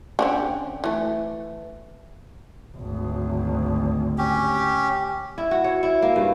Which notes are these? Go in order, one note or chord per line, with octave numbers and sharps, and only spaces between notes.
D3 C4 C#4
E3 A3
G#1 D2
C#4 G4
E4
F#4
C#5
E4
A#3
G2